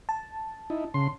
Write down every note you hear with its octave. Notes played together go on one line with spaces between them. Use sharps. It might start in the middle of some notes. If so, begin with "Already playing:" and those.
A5
D#4 E4
C#3 C6